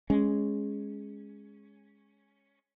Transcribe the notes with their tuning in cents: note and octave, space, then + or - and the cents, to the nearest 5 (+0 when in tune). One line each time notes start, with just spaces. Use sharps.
G#3 +0 C#4 +0